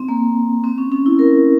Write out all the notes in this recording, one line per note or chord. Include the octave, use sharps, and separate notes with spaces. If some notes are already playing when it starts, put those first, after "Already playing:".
Already playing: C4
A#3
C4
C#4
C#4
E4
A#4